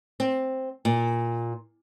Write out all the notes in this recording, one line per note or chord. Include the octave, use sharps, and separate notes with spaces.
C4
A#2